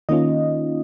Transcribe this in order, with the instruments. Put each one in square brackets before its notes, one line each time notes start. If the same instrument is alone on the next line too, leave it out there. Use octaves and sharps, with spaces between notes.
[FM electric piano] D#3 A#3 C#4 D#4 F4 D#5